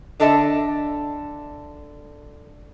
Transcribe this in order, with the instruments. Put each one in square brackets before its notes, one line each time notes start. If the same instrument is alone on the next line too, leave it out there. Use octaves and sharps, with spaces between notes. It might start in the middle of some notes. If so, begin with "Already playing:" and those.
[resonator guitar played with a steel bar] D3 D4 A4 D#5 E5